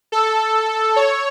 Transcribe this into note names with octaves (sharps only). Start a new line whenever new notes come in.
A4
C#5